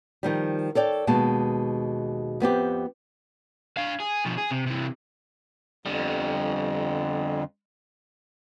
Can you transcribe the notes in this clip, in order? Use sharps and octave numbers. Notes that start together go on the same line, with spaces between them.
D#3 F3 G3
A4 C#5 D5 G5
D#2 B2 G#3 A5
F2 B3 C4 G4
D4 F5
G#4
B2 F3
G#4
C3
C3 E3
F2 D3 G3